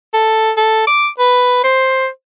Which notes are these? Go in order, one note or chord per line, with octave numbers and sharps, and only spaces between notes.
A4
A4
D6
B4
C5